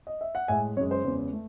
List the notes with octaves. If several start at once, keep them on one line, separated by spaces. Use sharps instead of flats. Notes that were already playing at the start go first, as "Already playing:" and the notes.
D#5
E5
F#5
A2 G#3 E5 G#5
F#2 C#3 G#3 C#5
C5
E2 C#3 G#3
A3